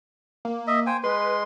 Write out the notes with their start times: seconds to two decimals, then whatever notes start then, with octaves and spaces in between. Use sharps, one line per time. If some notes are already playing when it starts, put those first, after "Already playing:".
0.45 A#3
0.67 D#5 E5
0.86 C5 G5 G#5
1.04 G#3 B4 C6